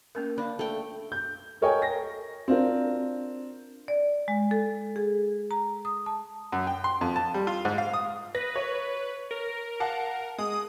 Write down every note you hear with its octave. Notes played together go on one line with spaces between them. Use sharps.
A#3 C#4 A#4
D4 F5 B5
A3 G5
G6
A4 A#4 C#5 D#5 G5 G#5
A#6
C4 D4 F4 A#4
D5
G#3
A4
G#4
A#5
D#6
A5
F#2
G5
C6
F2
A5
G3
F4
G#2
F5
D#6
B4 A#6
C#5
A#4
F5 F#5 A5
G#3 D#6